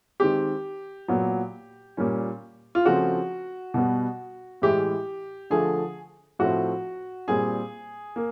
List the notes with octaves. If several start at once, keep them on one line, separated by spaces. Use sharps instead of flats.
D#3 G#3 C4 G4
A#2 F#3 B3
A#2 G3 A#3 C#4
F4
C#3 F3 A3 C4 F#4
B2 G3 B3
A2 E3 G#3 G4
D3 F3 A3 G#4
A2 F3 A3 C4 F#4
A#2 G3 C4 G#4
A#3